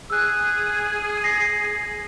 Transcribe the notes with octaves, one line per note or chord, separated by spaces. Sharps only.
G#4 E6 F#6
A#6 C7